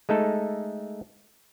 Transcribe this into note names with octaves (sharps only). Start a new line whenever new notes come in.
G#3 A3 D#4 A4